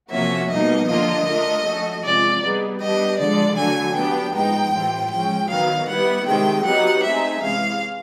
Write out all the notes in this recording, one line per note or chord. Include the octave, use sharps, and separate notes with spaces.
C3 F3 A#3 C#4 F#4 E5
B2 G3 A#3 D#4 D#5
D3 F3 A#3 D4 F4 D#5
A3 D4 F4 A#4
F3 A3 C#4 F#4 A4
C3 F3 G#3 C#4 F4 D5
G3 B3 D#4 G#4
G3 B3 D4 G4 D#5
D3 F3 G#3 D5
D3 F#3 A3 G#5
F#3 B3 D4 G4 G5
A2 F3 G#3 B3 D#4 G5
A2 E3 G3 C4 F4
F3 G#3 C#4 G5
D#3 F#3 B3 D#4 F5
G3 B3 E4 F#5
C3 D#3 G#3 G5
F#3 B3 D#4 G4 F#5
A3 C4 D#4 G#4 E5
C3 E3 G#3 C#4 F5